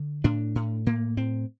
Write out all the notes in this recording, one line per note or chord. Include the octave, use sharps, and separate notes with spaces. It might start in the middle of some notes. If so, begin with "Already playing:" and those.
Already playing: D3
A2 D4
A2
A2 A#3
A2 C4